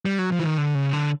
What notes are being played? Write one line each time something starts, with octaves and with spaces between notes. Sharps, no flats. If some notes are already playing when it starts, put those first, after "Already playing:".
G3
F#3
F3
E3
D#3
D3
C#3
D3